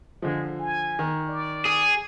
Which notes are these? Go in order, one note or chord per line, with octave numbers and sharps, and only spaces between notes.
D3 F3 G#3
G#5
D#3
D5
G#4